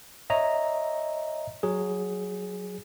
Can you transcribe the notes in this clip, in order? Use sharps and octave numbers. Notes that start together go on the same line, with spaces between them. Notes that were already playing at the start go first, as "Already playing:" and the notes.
C#5 D#5 E5 A#5
F#3 G#4